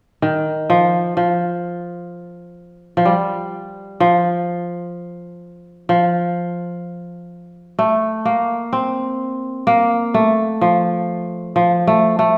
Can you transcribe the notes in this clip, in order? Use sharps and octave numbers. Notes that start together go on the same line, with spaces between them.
D#3
F3
F3
F3
G3
F3
F3
A3
A#3
C4
A#3
A3
F3
F3
A3
A3